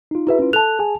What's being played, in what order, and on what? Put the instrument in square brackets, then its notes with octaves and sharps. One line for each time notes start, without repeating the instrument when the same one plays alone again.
[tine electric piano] D#4 F4
[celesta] E4 B4 [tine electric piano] F#4 G#4 E5
[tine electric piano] C#4 F4
[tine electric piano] A4 F#6 [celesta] A5 F7
[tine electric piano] G#4 G#5